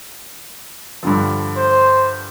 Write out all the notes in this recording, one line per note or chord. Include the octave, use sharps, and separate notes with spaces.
G2 D3 F3
C5